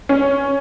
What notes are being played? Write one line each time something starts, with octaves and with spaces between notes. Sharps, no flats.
C#4